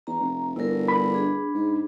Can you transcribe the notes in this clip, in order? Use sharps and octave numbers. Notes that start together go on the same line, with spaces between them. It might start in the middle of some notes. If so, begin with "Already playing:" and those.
E2 A#5
F1
G1 E4 A#4
B5
D4 G#4
G#2